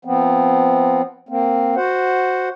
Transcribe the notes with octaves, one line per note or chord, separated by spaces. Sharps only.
F3 B3 C4
A#3 C4
F#4 C5 F#5